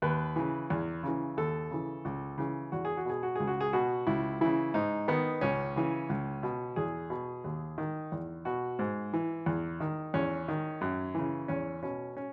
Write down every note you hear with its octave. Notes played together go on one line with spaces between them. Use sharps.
D#2 B4
C#3 E3
E2
C#3 E3
D#2 A4
C#3 E3
C#2
C#3 E3
E2 F#4
G#4
F#4
B2 G#4
F#4
C#2 G#4
F#4
G#4
B2 F#4
C#2 E4
C#3 E3 E4
G#2 D#4
D#3 B3
C#2 C#4
C#3 E3
C#2
B2
E2 G#4
B2
D#2
D#3
E2
B2 F#4
G#2
E3
E2
D#3
E2 C#4
D#3
F#2
C#3 E3
E2 C#4
B2 C#4
C#4